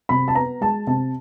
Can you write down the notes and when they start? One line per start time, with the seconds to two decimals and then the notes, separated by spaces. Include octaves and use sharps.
0.09 C3 B5
0.28 A5
0.35 B3 A#5
0.61 G#3 A5
0.87 C3 A5